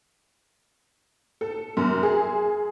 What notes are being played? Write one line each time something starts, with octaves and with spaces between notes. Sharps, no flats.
A4
F#2
G#4